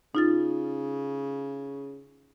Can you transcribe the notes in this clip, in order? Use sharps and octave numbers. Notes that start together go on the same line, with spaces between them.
C#3 D#4 F4 A6